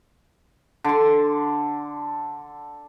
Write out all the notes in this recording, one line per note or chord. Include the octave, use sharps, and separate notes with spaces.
D3 C6